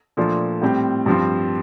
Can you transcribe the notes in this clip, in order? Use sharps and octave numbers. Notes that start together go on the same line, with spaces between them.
A#2 F3 A3 D4 F4
A2 G3 C4 G4
G2 F3 C4